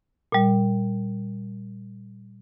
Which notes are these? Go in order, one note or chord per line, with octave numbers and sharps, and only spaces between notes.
A#2 G3